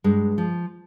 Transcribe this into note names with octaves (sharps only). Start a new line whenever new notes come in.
G2 G#3
F3